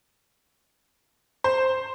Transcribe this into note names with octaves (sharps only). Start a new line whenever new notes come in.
C5